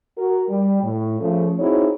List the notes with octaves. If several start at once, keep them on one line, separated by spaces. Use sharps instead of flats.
F#4 A#4
G3
A2
C#3 F3 A3
C4 D#4 E4 F#4 G#4 C#5